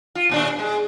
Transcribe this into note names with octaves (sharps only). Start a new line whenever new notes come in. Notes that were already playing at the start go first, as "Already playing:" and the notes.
F4
D#2 A#2 D4
G#3